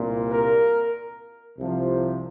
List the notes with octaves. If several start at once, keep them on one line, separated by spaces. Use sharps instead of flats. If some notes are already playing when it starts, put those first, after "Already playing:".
Already playing: C2 A#2 A#3
A#4
C2 C3 F3